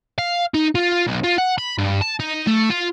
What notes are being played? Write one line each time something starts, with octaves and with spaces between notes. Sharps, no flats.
F5
D#4
F4
B1
F4
F#5
B5
G2
A5
D#4
A3
F4